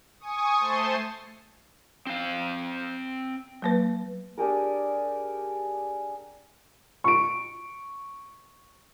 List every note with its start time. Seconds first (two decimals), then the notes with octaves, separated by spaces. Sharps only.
0.20 G#5 C#6 D#6
0.59 A3 C5 A5 C6
2.07 C4 F5
3.62 F#3 A#3 B4
4.38 D4 G4 G#4 A#4
7.04 C#6 D7